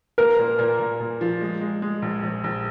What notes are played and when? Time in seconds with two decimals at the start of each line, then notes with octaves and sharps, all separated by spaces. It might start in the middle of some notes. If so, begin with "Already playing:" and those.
0.18 A#3 A#4
0.39 A#2
0.59 A#2
0.80 A#2
1.00 A#2
1.21 F3
1.41 G#3
1.61 G#3
1.82 G#3
2.02 A#1
2.23 A#1
2.44 A#1